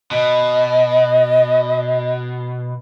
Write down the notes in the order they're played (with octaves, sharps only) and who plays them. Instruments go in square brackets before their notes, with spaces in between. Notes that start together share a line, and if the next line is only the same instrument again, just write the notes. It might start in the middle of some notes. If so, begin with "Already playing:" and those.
[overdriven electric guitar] B2 [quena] D#5